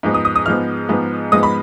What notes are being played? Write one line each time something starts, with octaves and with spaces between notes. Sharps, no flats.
G#2 F3 G#3 B3
D#6
D#6
D#6
G#2 F3 G#3 B3 F6
G#2 F3 G#3 B3
G#2 F3 G#3 B3 D#6
B5